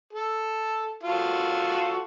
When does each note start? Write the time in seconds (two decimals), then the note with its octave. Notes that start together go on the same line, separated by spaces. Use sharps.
0.13 A4
1.03 F4 F#4 A4